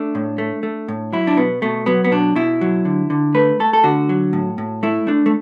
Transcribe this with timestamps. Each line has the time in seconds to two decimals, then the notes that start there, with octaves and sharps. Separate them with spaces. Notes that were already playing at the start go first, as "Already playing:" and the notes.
Already playing: A3 D4
0.15 A2
0.38 A3
0.63 A3
0.88 A2
1.13 F#3 E4
1.27 D4
1.37 B2 B3
1.62 B2 A3
1.86 F#3 B3
2.04 B3
2.11 B2 D4
2.36 B2 E4
2.61 F#3
2.85 D3
3.10 D3
3.34 A3 B4
3.60 A3 A4
3.73 A4
3.84 D3 F#4
4.09 F#3
4.33 A2
4.58 A2
4.83 A3 E4
5.07 A3 D4
5.26 A3